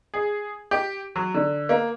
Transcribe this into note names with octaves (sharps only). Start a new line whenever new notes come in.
G#4
G4
F#3
D3
A#3